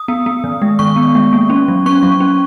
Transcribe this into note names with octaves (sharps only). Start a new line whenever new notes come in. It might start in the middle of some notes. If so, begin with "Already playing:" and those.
Already playing: D#6
B3
B3
D#3
G#3
D#3 C#6
B3
G#3
A#3
C#4
F#3
C#4 C#6
F#3
C#4